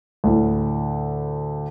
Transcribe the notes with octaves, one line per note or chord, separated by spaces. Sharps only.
D2 A2